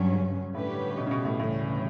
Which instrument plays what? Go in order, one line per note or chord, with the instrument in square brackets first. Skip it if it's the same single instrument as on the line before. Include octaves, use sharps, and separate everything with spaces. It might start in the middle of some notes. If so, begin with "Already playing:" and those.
Already playing: [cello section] G2 F#3 C#4 [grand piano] D3
[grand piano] C#3
[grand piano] A2 [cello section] D3 G3 C#4 G4 B4
[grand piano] B2
C#3
B2
A2
[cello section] D2 C#3 E3 G3 C#4 [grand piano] A2